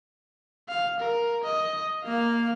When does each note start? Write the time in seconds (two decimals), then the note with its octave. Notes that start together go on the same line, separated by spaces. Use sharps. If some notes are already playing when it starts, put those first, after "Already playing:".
0.69 F5
1.00 A#4
1.44 D#5
2.04 A#3 F5